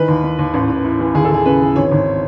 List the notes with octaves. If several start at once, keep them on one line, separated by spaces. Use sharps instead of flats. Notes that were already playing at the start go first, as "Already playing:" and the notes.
Already playing: D#3 E3 B4
D#2
D#3
D#2
A1
A1
A2
E3
D#2 G#4
A4
D#2 G#4
C#3 B4
E3
G#1 C#5
G#1